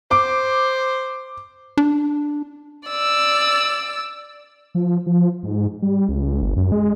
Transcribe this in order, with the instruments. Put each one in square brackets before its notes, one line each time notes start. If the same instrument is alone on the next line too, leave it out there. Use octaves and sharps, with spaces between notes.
[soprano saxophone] C5 [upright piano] D6
[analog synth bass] D4
[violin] D5 E6
[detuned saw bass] F3
F3
G#2
G3
C#2
G1
F#2
G#3